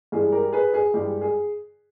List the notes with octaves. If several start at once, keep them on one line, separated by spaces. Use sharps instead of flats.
G2 E3 G#3 G#4
G4 A#4
G#4 B4
G#4
G2 E3 G#3 G4
G#4